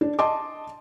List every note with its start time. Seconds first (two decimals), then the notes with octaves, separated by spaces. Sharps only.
0.01 D4
0.19 D#5 A5 C6 D6